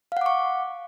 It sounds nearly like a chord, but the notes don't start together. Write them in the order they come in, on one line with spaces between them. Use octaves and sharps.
F5 F#5 D6 C#6